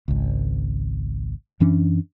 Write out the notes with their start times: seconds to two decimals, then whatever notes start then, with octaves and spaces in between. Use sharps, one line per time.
0.08 G#1 C#2
1.60 F#2 E3 C#4 D4